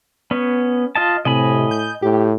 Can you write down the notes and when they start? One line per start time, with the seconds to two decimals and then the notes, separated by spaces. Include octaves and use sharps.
0.31 B3 C#4
0.95 F4 D#5 A5
1.25 A2 C3 D#5 G#5 B5
1.71 G6
2.02 A2 G4